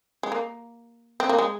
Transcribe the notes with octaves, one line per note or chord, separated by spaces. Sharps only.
G#3
A#3
C4
A#3
G#3